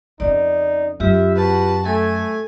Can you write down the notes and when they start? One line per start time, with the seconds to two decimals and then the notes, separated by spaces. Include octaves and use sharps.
0.20 F2 C#3 D#4 D5
1.00 F#2 F4 G4 E5
1.36 F#4 B4 A5
1.86 A3 A4 G#5